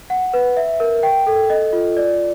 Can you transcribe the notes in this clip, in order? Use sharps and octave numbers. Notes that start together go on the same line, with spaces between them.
F#5
B4
E5
A#4
G5
A4
D#5
F4
D5